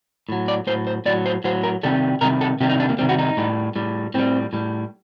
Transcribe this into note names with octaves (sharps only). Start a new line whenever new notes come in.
A2 F#3
D5
A2 F#3 C5
C5
A2 F#3 D5
C5
A2 F#3 C5
A#4
C3 D#3 G3 A4
C3 D#3 G3 A#4
A4
C3 D#3 G3 G4
D#4
D4
A#3
C3 D#3 G3 C4
F#4
D#4
A2 G3
A2 G3
A2 G3 C4
A2 G3